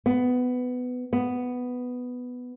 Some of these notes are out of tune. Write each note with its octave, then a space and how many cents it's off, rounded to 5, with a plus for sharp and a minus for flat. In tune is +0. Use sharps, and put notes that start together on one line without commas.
B3 +15
B3 +5